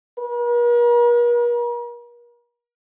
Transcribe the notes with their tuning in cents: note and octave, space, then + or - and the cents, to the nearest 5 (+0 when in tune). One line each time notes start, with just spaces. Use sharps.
A#4 +45